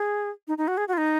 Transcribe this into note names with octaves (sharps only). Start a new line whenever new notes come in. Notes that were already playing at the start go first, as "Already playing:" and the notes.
Already playing: G#4
D#4
D#4
F#4
G#4
F#4
F4
D#4